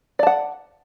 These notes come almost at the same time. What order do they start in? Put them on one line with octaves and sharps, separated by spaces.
D5 A5 F#5